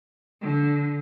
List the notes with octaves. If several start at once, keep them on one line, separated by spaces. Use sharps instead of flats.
D3